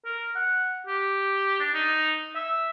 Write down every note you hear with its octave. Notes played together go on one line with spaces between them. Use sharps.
A#4
F#5
G4
D4
D#4
E5